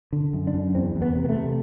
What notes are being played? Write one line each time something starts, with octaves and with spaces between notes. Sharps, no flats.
D3
F#2
D4
F#2
E2 C4
E2
B3
C3
B3
A3
C3